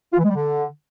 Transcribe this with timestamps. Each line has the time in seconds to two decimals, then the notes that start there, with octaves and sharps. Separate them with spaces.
0.12 F4
0.18 E3
0.24 G#3
0.29 G3
0.35 D3